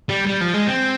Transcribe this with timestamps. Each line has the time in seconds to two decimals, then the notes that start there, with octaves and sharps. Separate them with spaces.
0.09 G3
0.27 G3
0.41 F3
0.54 G#3
0.67 C4